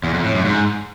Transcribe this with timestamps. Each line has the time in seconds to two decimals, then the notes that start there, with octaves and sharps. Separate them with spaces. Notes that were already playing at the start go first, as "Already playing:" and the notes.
0.04 E2
0.14 F2
0.24 A2
0.34 F#2
0.45 G#2